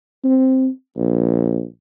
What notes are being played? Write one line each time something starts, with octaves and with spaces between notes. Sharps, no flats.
C4
A#1